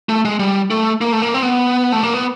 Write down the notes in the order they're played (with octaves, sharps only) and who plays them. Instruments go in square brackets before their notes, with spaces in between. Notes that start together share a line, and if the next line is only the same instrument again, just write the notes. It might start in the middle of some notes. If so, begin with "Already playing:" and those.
[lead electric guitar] A3
G#3
G3
A3
A#3
A3
A#3
C4
B3
A3
A#3
B3